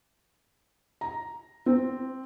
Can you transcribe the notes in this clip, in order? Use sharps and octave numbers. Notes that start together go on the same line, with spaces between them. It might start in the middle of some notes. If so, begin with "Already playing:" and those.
A#5
C4